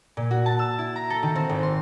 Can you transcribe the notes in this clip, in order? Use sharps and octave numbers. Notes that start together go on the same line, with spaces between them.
A#2
F#4
A5
E6
E4
A#5
A4
D#3
C4
G#1
C6